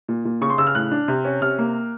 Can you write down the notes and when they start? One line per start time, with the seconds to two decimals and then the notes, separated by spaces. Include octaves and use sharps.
0.08 A#2
0.25 A#2
0.41 C#3 C#6
0.50 C6
0.58 C#3 E6
0.67 F6
0.75 A2 F#6
0.92 D4
1.08 C3
1.25 C#4
1.41 C3 F6
1.58 A#3